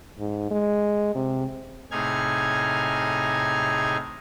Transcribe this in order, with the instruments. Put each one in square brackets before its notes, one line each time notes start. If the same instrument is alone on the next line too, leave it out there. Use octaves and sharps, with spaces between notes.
[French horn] G#2
G#3
C3
[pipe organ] A2 C3 D#4 G#4 F6 G#6